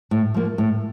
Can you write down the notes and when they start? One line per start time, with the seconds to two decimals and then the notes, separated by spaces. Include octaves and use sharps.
0.11 A2
0.34 F3 A#3
0.58 A2